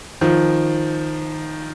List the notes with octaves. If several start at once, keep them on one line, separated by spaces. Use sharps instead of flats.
D#3 F3